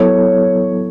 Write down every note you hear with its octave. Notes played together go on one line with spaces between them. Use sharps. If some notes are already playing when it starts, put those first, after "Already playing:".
Already playing: F#3 B3 E4 A4 C#5